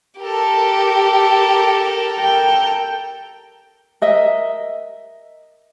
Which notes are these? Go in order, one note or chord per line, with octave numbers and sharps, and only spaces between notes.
G4 A4 A#4
G5
A#4 D#5 E5